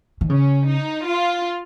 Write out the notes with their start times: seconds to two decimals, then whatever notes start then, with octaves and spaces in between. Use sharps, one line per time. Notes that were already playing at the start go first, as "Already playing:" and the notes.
0.21 D#3
0.30 C#3 C#4
0.67 D#4
1.06 F4